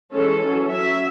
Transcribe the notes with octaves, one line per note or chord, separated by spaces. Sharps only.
E3 G#3 C#4 A4
F#3 C#4
F#3 C#4 E5